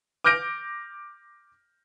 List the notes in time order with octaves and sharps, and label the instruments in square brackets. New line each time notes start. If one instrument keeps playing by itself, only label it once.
[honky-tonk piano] D6 F6 G6 A#6 D7